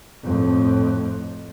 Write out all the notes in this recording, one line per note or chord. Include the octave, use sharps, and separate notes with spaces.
F2 A2